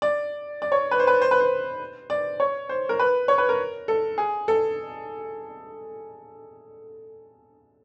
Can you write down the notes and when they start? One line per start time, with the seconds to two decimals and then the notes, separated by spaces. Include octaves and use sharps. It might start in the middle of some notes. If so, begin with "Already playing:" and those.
0.02 D5
0.62 D5
0.72 C#5
0.91 B4
1.00 C5
1.07 B4
1.22 C5
1.31 B4
1.40 C5
2.10 D5
2.40 C#5
2.69 C5
2.89 A#4
2.99 B4
3.28 C#5
3.38 B4
3.49 A#4
3.88 A4
4.18 G#4
4.48 A4